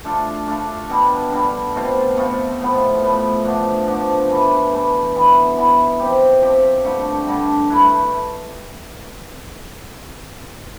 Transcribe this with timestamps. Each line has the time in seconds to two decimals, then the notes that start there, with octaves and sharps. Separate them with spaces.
0.04 A3 D4 F4 A4
0.47 A3 D4 F4 A4
0.89 B2 G3 D4
1.32 B2 G3 D4
1.75 B2 A3 C4 F4
2.16 B2 A3 C4 F4
2.60 A2 F3 B3
3.01 A2 F3 B3
3.45 D3 F3 A3 D4
3.87 D3 F3 A3 D4
4.30 G2 E3 A3
4.72 G2 E3 A3
5.15 E3 B3 E4
5.57 E3 B3 E4
5.99 F3 C4 G4
6.42 F3 C4 G4
6.84 G2 D3 A3
7.27 G2 D3 A3
7.70 A3 E4 B4